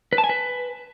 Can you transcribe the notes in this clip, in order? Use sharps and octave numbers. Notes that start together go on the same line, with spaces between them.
B4
A5
G#5
B4